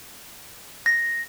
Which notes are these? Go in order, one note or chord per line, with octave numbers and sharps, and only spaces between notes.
A#6